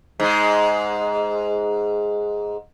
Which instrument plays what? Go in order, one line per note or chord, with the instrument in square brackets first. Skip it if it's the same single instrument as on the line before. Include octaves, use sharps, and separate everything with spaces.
[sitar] G#2 G#3